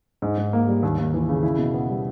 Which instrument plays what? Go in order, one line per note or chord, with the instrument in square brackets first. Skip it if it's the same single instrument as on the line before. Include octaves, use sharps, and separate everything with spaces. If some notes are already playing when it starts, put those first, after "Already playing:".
[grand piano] G#2
G#2
A#3
G3
D#2
D#2
E3
C#3
E4
B2
B3
G3